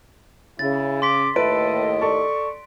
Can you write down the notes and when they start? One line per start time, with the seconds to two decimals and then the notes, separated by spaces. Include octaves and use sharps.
0.59 C#3 E4 A6
1.02 C6 D6 B6
1.36 D#2 A2 A4 B4 D#5 E5 D7
2.01 A4 D5 C#6